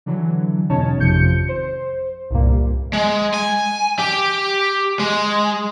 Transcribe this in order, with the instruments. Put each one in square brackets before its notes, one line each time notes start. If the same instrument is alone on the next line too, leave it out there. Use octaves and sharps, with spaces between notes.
[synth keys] D3 E3 F#3
E2 B2 C#4 D#4 C#5 A5
G#1 F2 C3 F3 G6 C#7
C5
C2 G2 A#2 G3 A#3
[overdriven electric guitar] G#3
G#5
G4
G#3